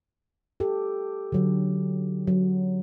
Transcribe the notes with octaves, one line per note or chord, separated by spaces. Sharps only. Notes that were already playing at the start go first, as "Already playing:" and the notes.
G4 A4
D3 F#3
F#3